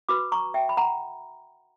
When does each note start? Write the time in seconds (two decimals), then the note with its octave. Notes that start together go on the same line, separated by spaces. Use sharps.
0.09 F#4 B4 B5 D6
0.32 A#5 C#6
0.54 E5 G5
0.69 B5
0.77 F#5 A#5